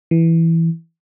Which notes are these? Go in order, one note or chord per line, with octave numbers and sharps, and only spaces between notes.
E3